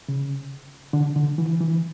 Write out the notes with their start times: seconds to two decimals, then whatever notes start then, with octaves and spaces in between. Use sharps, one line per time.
0.09 C#3
0.93 D3
1.16 D3
1.38 E3
1.61 E3